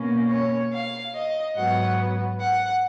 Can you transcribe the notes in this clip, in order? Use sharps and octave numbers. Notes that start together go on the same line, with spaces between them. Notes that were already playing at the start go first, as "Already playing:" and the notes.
Already playing: B2 A#3 C#4
C#5
F5
D#5
G#2 F#3 B3 F#5
F#5